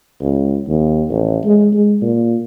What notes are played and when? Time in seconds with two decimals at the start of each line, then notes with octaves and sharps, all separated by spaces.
0.21 C#2
0.68 D#2
1.10 A1
1.44 G#3
1.73 G#3
2.02 A#2